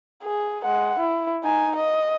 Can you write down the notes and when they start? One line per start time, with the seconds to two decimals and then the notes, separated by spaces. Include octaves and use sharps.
0.23 G#4
0.65 G#3 F#5
0.99 E4
1.43 D#4 G#5
1.76 D#5